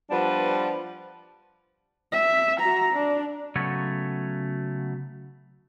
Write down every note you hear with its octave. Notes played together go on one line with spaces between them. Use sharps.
F3 G3 B3 D4 B4
E5
F#4 A#5
D4
C#3 F#3 A3 B3 C#5